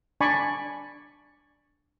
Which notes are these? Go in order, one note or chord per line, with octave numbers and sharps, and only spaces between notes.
D4 D5 G#5 B5 C#6